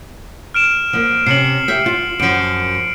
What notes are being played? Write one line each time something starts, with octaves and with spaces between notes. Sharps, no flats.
F6 D7 E7
F3 A#3
C3 C#4 C7 C#7 F#7
G4 E5
F4
F#2 F3 C#7 D7